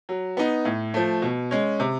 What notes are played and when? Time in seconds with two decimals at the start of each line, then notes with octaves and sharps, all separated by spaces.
0.09 F#3
0.37 B3 D#4
0.65 A2
0.94 F3 A3
1.22 B2
1.51 G#3 C#4
1.80 C3